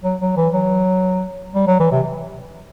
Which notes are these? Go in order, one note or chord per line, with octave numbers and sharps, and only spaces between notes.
F#3
F#3
E3
F#3
G3
F#3
E3
C3